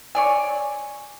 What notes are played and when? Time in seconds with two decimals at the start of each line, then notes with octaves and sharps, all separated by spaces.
0.15 C#5 D5 G#5